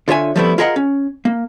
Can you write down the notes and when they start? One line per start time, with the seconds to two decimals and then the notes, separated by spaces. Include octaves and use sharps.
0.08 D3 F4 C#5 E5 G#5
0.36 F3 G3 A3 B3 C4 E4
0.58 F4 G#4 A#4 D#5 E5 F#5
0.76 C#4
1.25 A#3